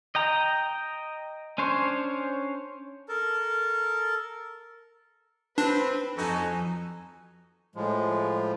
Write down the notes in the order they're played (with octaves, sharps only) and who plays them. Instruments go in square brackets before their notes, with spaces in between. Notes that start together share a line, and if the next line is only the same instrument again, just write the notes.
[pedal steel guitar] D#5 G5 A#5
C#4 D4 C5 C#5
[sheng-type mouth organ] A4 A#4 A5
[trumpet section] C4 [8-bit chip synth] D4 [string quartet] B4 B5
[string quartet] F2 G#5 [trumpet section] D#4 F#4 A4
[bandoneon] A2 F3 [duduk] G#3